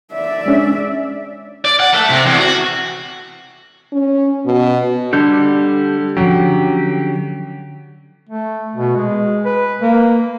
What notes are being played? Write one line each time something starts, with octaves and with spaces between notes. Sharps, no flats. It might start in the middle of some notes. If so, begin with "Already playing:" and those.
D5 E5
G#3 C#4 D4
D5
F#5
A3
C3
E2
F#4
C#4
B2
D3 G3 A4 G6
D3 F3 F#3 C#4 G4
A3
B2
G#3
B4
A#3